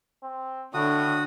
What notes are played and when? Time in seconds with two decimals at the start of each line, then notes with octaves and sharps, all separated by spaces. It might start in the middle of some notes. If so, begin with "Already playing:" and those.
0.23 C4
0.74 A2 D3 F#4 D#6